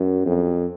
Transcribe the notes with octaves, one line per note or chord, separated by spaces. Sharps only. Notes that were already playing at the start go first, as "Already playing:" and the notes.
Already playing: F#2
F2